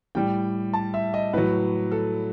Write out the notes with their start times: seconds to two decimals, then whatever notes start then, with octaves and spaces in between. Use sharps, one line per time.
0.15 A2 G3 G5
0.73 A5
0.94 E5
1.14 D#5
1.33 A2 F#3 B4
1.91 A4